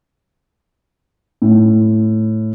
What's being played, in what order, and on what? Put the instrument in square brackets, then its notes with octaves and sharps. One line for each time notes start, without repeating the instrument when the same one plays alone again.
[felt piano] A2